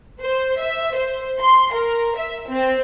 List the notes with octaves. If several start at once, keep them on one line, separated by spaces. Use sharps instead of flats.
C5
E5
C5
C6
A#4
E5
C4